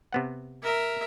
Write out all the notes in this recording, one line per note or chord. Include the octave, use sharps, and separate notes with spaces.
C3 B3 F#5
A#4 E5